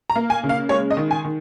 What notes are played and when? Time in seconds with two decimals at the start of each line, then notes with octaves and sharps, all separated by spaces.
0.10 A#5
0.16 A#3
0.30 G#5
0.43 C#3
0.49 F5
0.69 G#3 C#5
0.91 D#5
0.97 D#3
1.11 G#5
1.25 D#3